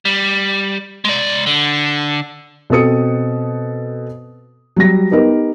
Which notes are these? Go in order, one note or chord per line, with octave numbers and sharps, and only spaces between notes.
G3
G#3 D5
D3
B2 C4 A4 D#6 C#7
F#3 G3 A#6
B3 D#4 G4 A#4 B4